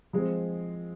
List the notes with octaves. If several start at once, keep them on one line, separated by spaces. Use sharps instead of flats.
F3 G#3 C4